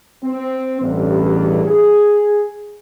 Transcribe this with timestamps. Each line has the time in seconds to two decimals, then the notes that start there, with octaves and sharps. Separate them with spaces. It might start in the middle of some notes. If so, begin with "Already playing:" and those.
0.24 C4
0.81 A1 E2 G2
1.65 G#4